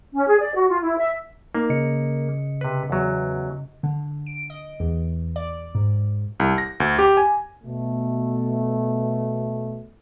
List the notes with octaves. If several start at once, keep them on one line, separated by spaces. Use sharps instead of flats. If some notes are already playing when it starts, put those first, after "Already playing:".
C#4
G#4
D5
F#4
F4
E4
E5
A#3 D#4
C#3 D#5 C#7
C3 B4
E2 F#3
D3
D7
D#5
E2
D5
G#2
C2
A#6
D2
G4
G#5
B2 A3